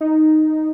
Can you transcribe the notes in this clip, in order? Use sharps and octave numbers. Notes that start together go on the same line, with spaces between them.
D#4